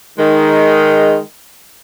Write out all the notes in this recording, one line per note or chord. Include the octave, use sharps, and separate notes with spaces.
D#3 G#3